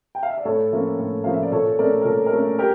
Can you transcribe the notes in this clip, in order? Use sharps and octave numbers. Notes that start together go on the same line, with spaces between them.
G5
F5
E5
D5
A2 A4 C#5
F3 A#3 C#4
A2
F3 A#3 C#4 F5
E5
D5
A#2 A4 C#5
A3 C#4 A#4 D5
A#4
A#2 A4 C#5
A#4
A3 C#4 A4
G4 A#4